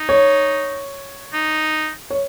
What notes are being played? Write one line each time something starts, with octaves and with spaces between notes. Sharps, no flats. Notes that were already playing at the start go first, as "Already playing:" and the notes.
Already playing: D#4
C#5
D#4
C#5